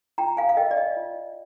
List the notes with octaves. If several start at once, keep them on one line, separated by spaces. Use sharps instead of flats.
F4 G5 A#5
F5 G#5
F5
A#4 D#5 G5
D5
D#5
F4